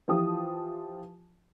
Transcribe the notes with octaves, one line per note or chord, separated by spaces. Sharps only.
E3 F3 F4 G4 D#6